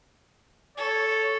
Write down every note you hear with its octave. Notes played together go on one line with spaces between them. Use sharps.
A4 C#5